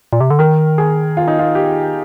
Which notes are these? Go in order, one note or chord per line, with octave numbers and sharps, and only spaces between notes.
A#2
C3
D3
D#3 A#4
G#4
F4
D#4
F4
G4